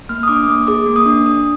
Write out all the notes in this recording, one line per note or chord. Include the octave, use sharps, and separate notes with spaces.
A#3 F6
D#6
D4 D6
A#3 D#6
G#4 D6
A#3
D#6
D4
D4 D#6